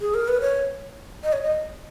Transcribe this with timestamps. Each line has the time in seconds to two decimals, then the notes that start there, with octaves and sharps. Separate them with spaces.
0.01 G#4
0.14 A#4
0.28 B4
0.41 C#5
1.23 D#5
1.33 C#5
1.42 D#5